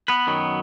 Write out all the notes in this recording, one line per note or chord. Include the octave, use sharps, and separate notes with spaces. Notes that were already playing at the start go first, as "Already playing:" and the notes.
B3 B4
F#2 D#3 F#3